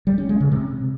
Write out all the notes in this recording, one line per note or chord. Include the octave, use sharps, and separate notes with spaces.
G3
C#4
G#3
C#3
C3